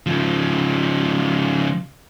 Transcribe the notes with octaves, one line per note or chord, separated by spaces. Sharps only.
C#3 F3